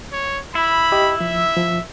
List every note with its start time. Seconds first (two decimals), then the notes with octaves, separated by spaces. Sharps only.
0.13 C#5
0.55 E4 B5
0.92 G4 D#5
1.21 F3 E5
1.57 F3